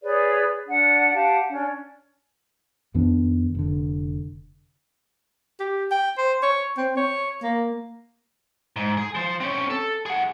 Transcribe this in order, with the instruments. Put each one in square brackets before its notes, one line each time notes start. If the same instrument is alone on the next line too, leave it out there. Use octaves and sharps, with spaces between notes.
[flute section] G#4 B4 C#5 D5
D4 F#5
G4 F5 F#5 A5
C#4 D4
[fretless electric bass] F2 D#3 B3 D4
F1 D3
[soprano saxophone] G4
G5
C5
C#5
C4
C#5
A#3
[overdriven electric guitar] G#2
G#4
F3 C5
C4 C#4
A4
G#4 F#5